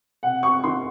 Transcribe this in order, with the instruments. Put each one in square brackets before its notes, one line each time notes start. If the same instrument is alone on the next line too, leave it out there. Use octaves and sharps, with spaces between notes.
[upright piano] C3 F#5
C#6
D#3 C6